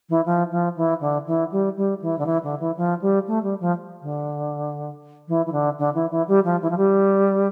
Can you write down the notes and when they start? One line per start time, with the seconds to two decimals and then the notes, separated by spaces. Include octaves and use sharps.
0.09 E3
0.26 F3
0.51 F3
0.77 E3
1.01 D3
1.27 E3
1.52 G3
1.77 G3
2.02 E3
2.18 D3
2.26 E3
2.43 D3
2.60 E3
2.77 F3
3.02 G3
3.27 A3
3.43 G3
3.60 F3
4.02 D3
5.28 E3
5.46 E3
5.52 D3
5.78 D3
5.95 E3
6.11 E3
6.28 G3
6.45 F3
6.62 E3
6.70 F3
6.77 G3